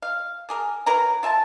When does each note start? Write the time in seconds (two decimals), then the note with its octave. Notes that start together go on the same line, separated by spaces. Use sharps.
0.02 F5
0.49 A#3 G#4 A#4
0.86 F#3 A#4 B4 A#5
1.23 F4 E5 G#5 A5